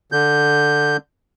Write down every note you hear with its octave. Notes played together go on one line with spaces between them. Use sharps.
D3 G6